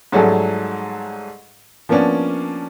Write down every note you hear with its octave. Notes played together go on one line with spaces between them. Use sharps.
G#2 F#3 G3 A3 G#4 A4
F3 A#3 B3 C#4 D4